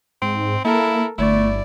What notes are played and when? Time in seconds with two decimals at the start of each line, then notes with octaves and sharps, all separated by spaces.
0.22 G#2 C4
0.65 A#3 E4 A4 A#4
1.18 G1 A3 E4 D5